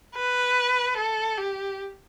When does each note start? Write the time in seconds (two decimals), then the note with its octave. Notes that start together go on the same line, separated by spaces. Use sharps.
0.15 B4
0.97 A4
1.38 G4